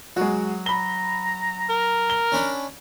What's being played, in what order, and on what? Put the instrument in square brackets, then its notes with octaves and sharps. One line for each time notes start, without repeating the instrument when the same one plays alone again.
[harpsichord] F#3 [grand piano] G#3 F#4
[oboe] A#5 [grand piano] B5 G7
[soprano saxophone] A#4
[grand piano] G7
[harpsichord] C#4 D4 B5